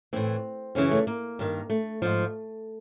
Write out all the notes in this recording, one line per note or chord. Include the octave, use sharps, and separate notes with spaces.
A2 E3 C4
F#2 C#3 E3 C#4
A3
A#3
G2 D#3
A3
G#2 F3